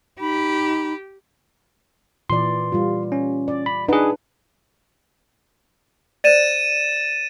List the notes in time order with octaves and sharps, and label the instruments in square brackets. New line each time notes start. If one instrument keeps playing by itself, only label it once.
[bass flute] D#4 [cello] G4 [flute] B5
[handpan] A#2 E3 D5 [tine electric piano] C6
[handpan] G3 F4
[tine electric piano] C#4
[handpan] D5
[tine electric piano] B5
[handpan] D4 B4 F#5 [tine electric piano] D#4 G#4
[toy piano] C5 D5 [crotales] A6 D#7 E7